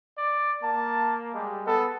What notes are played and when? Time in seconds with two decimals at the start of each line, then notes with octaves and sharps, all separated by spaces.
0.17 D5
0.63 A#3 A5
1.34 G3 G#3
1.66 B3 A4